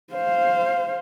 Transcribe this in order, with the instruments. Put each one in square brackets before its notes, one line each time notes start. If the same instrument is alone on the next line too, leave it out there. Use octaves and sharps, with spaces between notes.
[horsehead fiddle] C5 F5